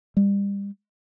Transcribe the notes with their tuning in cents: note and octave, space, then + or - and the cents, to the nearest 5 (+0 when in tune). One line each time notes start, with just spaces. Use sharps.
G3 +30